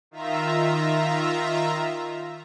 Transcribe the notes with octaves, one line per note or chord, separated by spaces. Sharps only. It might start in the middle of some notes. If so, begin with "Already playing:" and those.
D#3 F4 E5 A#5